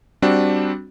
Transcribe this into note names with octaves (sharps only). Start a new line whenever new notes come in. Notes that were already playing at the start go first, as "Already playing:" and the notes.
G3 C4 D4 F#4